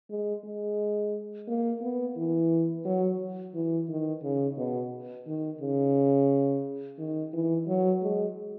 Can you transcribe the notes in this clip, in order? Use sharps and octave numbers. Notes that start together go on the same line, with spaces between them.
G#3
G#3
A#3
B3
E3
F#3
E3
D#3
C#3
B2
D#3
C#3
D#3
E3
F#3
G#3